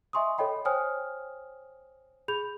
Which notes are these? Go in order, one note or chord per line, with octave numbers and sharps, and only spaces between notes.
D#5 E5 G#5 C6 C#6 D#6
A4 C#5 D#5 G5 B5
C5 C#5 G5 G#5 D#6 F6
G#4 B5 G6 F7